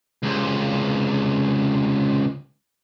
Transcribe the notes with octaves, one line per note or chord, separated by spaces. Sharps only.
C#2 C3